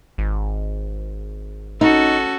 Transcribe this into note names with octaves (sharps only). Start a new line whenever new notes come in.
G#1
C#4 D#4 F#4 A4